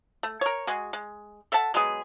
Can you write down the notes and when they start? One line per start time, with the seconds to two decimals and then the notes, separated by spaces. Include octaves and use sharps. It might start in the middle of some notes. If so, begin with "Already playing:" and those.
0.23 A3
0.41 A#4 C#5
0.67 G#3 F#4 G#4
0.93 G#3
1.52 A4 E5 F#5 A5
1.74 F#3 G#3 B3 G#4